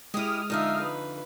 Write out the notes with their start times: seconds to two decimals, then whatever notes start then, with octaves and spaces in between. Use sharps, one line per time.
0.14 G#3 E4 G4 D#6 F6
0.50 F2 D3 D#4 E5 F5
0.82 B4